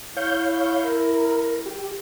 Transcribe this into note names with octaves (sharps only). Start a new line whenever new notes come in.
E4 C#5 F5 G6
A#4
G4